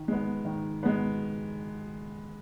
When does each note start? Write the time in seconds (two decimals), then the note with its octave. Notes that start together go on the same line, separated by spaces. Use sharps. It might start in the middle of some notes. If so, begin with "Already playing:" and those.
Already playing: D#3
0.08 G#3 B3
0.45 D#3
0.83 G#3 B3